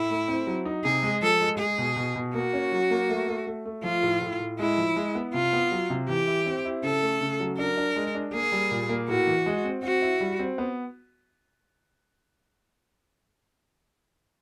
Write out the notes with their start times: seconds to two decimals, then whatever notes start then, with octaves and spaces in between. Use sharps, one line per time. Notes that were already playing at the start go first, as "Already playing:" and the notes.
Already playing: A2 E4
0.10 A3
0.28 C4
0.47 F#3
0.65 D#4
0.84 C3 G#4
1.03 G#3
1.22 F3 A4
1.41 G#3
1.59 G#3 G#4
1.78 B2
1.96 B2
2.15 B2
2.34 A#3 F#4
2.53 C#4
2.72 F#3
2.91 A#3
3.09 A3
3.28 A3
3.47 A3
3.65 A3
3.84 F3 F4
4.03 A2
4.22 A2
4.40 A2
4.59 G#3 E4
4.78 F3
4.96 G#3
5.15 B3
5.34 C3 F4
5.53 B3
5.72 F#3
5.90 C3
6.09 E3 G4
6.27 E4
6.46 C4
6.65 E4
6.83 C#3 A4
7.03 A3
7.21 C#3
7.40 F#3
7.58 D4 A#4
7.77 D4
7.96 G#3
8.15 D4
8.34 A#3 G#4
8.52 G3
8.71 A#2
8.89 A#3
9.08 A2 F#4
9.27 E3
9.46 G#3
9.64 C4
9.83 C4 F#4
10.02 E4
10.21 G3
10.39 C4
10.58 B3